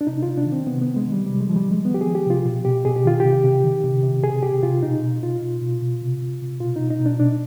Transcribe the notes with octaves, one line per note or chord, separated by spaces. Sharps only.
D4
C3 D#4
C3 F4
D4
D#3
C4
C3 B3
B3
D#3
G#3
D#3
G3
C3 G3
G#3
D#3 F3
G3
D#3 G#3
F3 B3
G4
F3 G#4
G4
C3 F4
B2
B2 G4
B2 G#4
G4
D#3 F4
C3 G4
C3
D#3
C3
C3
C3 G#4
C3 G4
C3 F4
B2 D#4
B2
B2 F4
B2
B2
B2
C3
C3
C3
B2 F4
B2 D#4
D#4
B2
D4
B2 D4